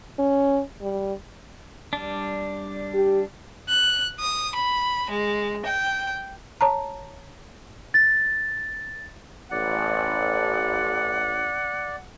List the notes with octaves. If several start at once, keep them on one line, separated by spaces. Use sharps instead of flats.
C#4
G3
G3 D4
G4
F#6
D#6
B5
G#3
G5
C#5 A5 A#5
A6
A1 D5 F#5